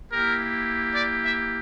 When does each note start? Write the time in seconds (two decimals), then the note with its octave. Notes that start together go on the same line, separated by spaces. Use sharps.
0.11 A#3 E4 G4 A#4
0.95 D5
1.24 E5